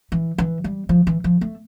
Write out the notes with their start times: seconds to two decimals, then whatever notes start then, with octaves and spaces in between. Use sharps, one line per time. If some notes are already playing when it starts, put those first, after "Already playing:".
0.12 E3
0.38 E3
0.64 G3
0.89 F3
1.07 E3
1.24 F3
1.41 A3